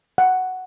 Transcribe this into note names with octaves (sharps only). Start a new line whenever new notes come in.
F#5